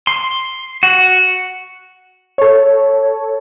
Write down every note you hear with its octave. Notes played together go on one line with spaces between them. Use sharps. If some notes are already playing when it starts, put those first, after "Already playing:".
C6
F#4
A4 C#5